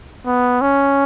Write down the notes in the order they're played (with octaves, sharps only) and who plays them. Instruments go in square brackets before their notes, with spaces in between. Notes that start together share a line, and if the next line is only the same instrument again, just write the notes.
[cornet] B3
C#4